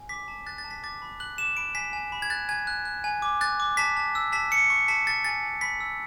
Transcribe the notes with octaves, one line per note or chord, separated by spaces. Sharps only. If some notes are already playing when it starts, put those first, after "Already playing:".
Already playing: G#5
D6 B6
A5
F#6 A6
A6
A5
B6
D6 A6
B5
F#6 F#7
D6 E7
B5 D7
G#5 B6
G#5
B5
G#6
F#6 A6
G#5 G#6
F#6
F#6
G#5
D6
F#6 A6
D6
A5 B6
A5
E6
A5 B6
E6 C#7
C#6
A5 B6
C#6 A6
G#5 A6
G#5
B5 B6
E6